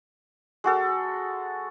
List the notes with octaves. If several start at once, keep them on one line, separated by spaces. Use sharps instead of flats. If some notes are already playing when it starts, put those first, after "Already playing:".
G#3 F#4 A4